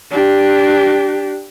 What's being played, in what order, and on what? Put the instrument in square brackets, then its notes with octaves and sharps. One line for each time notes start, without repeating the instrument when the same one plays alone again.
[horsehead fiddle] D4 G4